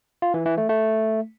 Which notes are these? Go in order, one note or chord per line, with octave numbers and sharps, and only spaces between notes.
F4
E3
E3
A3
A3